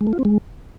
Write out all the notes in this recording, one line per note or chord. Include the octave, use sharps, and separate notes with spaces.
G#3
A3
F4
C4
G#3